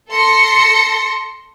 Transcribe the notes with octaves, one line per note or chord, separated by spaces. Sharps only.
A4 C6 A#6 C#7